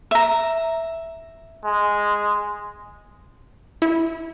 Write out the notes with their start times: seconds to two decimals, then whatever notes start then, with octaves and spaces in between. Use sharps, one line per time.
0.11 E5 A#5
1.64 G#3
3.82 E4